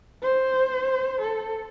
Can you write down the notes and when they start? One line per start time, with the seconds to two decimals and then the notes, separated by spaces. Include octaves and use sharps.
0.22 C5
1.21 A4